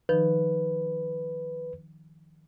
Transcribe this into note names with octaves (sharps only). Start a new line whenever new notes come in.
D#3 F3 D#4 B4